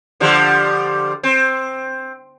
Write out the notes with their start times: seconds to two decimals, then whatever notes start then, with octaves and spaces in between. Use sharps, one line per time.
0.20 D3 F3 G3
1.23 C4